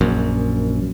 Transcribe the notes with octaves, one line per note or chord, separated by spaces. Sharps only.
A#1 F#2